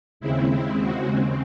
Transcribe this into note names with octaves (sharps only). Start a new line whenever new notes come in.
D#2 C#3 G#3 C4 E4
E4
F#4